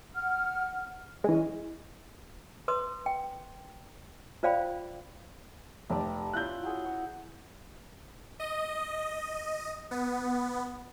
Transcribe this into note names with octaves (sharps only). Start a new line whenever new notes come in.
F#5 F6
E3 G#3 C#4 D#5 G#5
B4 C6 D#6
G5
F4 C5 D5 F5 G5 B5
F1 G3 D5
C#4 E4 F4 F#6 G6
F#3 G#4
F#4 C#5
D#5
B3